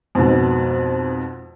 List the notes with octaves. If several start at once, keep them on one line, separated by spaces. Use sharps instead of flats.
F2 G#2 B2